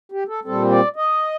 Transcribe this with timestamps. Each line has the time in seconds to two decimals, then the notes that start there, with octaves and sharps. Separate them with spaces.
0.12 G4
0.28 A4
0.45 A#2 G3 C4 A4
0.71 D5
0.96 D#5